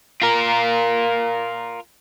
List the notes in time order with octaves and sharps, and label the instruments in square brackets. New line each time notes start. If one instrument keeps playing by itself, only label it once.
[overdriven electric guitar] F4 A#4